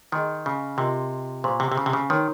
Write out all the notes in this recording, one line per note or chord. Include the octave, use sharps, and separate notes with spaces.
D#3 G#4 D#5 G#5 C6
C#3
C3 F4 A#4 D#5 G5 C6
A#2 G4 C5 F5 C6
C3
C3
C#3
C3
C#3
D#3 D#4 A#4 C#5 G5 C6